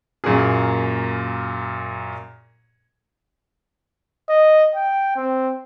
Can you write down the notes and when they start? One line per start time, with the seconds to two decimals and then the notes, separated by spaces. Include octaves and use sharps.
0.24 F#2 A#2 A#3 G#4
4.29 D#5
4.75 G5
5.16 C4